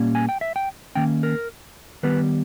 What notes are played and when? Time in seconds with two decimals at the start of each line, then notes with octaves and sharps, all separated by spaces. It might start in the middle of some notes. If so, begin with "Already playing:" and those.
Already playing: A#2 G3 A#3 C#4
0.15 G#5
0.29 G5
0.41 E5
0.56 G5
0.95 D#3 A#3 C#4 G5
1.23 A#4
2.03 D#3 G3 B3 B4